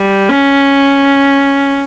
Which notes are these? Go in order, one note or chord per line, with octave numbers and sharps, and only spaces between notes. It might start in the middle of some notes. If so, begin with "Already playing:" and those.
Already playing: G3
C#4